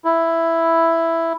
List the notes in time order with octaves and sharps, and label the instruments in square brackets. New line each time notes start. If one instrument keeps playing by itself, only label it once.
[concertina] E4